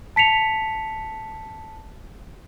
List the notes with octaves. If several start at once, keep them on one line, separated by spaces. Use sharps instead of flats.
A5 B6 C#7 F7